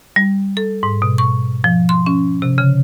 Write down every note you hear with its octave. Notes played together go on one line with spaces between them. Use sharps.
G3
A4
G#2
B2
C#6
F3
C6
C#4
C3
C#3